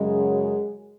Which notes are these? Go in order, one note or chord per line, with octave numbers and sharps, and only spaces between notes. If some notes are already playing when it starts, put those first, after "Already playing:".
Already playing: F#2 C#3 F#3 G#3